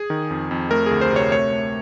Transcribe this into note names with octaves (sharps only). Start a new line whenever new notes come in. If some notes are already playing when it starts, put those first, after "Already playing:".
Already playing: G#4
D#3
F2
F2
A3 A#4
D2 G#4
C5
C3 C#5
A3 C#5
A3